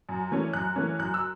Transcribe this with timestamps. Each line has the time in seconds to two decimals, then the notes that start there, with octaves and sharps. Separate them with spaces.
0.09 F#2
0.32 E3 A3 C#4
0.53 F#2 F#6
0.76 E3 A3 C#4
0.99 F#2 F#6
1.14 E6